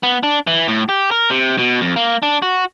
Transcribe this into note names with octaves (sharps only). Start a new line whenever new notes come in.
B3
D4
E3
A2
G4
A#4
C3
B2
F2
A#3
D4
F#4